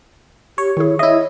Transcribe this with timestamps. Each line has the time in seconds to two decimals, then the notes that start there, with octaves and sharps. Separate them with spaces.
0.58 G4 C#5
0.77 D#3 E4 G#4
0.99 E4 C#5 D#5 E5